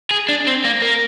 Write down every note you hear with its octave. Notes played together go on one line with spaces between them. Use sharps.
G#4
D4
C4
A#3
A#3